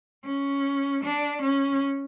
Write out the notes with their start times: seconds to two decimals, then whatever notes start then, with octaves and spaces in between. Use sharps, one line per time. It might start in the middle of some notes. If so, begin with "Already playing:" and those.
0.24 C#4
1.03 D4
1.42 C#4